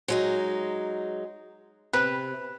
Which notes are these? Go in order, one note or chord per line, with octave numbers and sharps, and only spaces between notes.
F#3 G#3 D#4
C3 B4